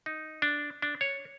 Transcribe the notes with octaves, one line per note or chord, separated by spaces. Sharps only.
D#4
D4
D4
C#5